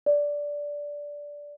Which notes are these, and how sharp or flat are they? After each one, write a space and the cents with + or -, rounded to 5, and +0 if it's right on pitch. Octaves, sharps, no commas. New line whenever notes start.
D5 -10